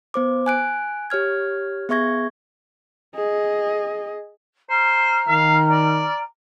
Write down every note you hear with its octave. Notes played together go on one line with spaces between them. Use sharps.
B3 C5 D6
G#5 F#6 D7
G4 C#5 F6 G#6
B3 G#4 E5 C#6 G#6 A#6
G#4 D#5
C5 A#5 F6
D#3 F5
D5